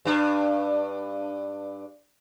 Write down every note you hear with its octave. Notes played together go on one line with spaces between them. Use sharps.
G2 D4